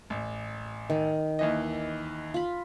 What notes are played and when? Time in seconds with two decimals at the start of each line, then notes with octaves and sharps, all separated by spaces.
0.10 A1
0.90 D#3
1.39 D#2 E3 D#5
2.34 F4 B5